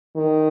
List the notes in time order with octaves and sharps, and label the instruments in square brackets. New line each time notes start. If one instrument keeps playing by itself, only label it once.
[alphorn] D#3